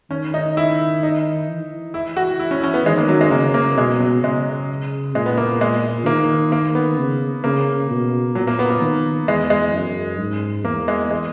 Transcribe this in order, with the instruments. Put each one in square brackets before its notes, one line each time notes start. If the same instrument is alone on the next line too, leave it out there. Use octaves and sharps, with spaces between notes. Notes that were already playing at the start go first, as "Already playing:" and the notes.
[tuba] D#3 [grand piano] C#4
[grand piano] D#4
E4
D#4
[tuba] E3
[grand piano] E4
F#4
E4
C#4
C#4
B3
[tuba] D#3 [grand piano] G#3
[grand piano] A#3
F#3
G#3
[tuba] C#3 [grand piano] A#3
[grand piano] A#3
[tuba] B2 [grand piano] G#3
[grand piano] F#3
[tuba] C#3 [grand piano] G#3
[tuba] A#2 [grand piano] G#3
[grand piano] B3
A#3
G#3
[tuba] D#3 [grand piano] A#3
[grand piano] A#3
B3
[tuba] C#3
[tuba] C#3 [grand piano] A#3
[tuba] B2
[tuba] A#2 [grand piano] F#3
[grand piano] A#3
B3
A#3
[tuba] D#3
[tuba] E2 [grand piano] G#3
[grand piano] G#3
[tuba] F#2
G#2
[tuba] E2 [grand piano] A#3
[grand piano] G#3
G#3